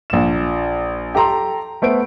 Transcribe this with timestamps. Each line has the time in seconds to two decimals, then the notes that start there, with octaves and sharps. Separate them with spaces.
0.10 A#1 E7
1.15 G4 A4 A#5 C6
1.82 A3 B3 C5 D7